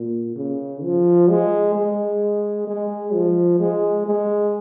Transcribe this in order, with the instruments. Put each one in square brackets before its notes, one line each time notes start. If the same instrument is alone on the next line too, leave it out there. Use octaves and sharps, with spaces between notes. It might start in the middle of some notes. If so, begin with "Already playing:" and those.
Already playing: [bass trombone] A#2
C#3
F3
G#3
G#3
G#3
F3
G#3
G#3